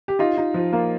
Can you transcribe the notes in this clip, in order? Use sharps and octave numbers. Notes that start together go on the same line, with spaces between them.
G4
D#4 F4
D#4
F3
A#3